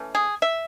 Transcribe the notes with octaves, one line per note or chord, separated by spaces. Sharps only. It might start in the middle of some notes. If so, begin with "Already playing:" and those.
Already playing: E3 A3 C#4
G#4
E5